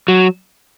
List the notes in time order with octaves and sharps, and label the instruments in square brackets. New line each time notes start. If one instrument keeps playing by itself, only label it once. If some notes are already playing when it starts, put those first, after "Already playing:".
[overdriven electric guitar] F#3